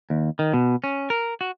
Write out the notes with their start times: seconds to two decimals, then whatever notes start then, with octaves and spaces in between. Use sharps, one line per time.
0.10 D#2
0.39 D#3
0.54 B2
0.84 C#4
1.10 A#4
1.41 F#4